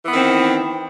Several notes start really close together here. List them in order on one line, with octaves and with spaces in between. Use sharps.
E3 B3 D#3 C4